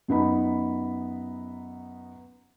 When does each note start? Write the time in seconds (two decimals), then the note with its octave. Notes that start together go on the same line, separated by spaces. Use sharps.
0.08 F#2 B3 D#4 B5